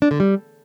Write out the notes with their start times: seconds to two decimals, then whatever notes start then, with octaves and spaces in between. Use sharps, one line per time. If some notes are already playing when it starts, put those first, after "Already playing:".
0.02 D4
0.11 D3
0.20 G3